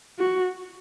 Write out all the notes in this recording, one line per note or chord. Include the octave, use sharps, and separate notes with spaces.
F#4